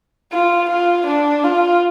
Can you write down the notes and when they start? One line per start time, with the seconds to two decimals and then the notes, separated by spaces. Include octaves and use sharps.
0.32 F4
0.69 F4
1.06 D4
1.43 F4